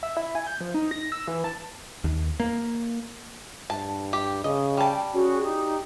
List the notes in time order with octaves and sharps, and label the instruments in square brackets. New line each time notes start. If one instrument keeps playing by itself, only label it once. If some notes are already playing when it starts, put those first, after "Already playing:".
[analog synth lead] E5
E4
G#5
G6
F3
D#4
A#6
E6
E3
A5
[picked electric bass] D#2
A#3
[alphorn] G2 [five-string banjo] A5
[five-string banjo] G4
[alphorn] C#3 [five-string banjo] D#5
[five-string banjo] G3 A5 [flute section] G5
[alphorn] C#4 [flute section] F#4 G#4
[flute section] D#4 [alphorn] G4